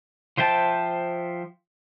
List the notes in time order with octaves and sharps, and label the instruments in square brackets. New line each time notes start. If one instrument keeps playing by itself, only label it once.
[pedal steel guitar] F3 C5 E5 G5 A5